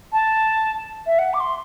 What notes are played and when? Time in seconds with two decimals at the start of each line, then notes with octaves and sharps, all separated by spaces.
0.12 A5
1.06 E5
1.19 F#5
1.33 D6
1.40 C6